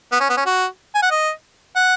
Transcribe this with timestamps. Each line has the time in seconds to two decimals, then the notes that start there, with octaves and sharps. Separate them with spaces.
0.12 B3
0.20 C#4
0.29 B3
0.37 C#4
0.46 F#4
0.95 G#5
1.02 F#5
1.11 D#5
1.76 F#5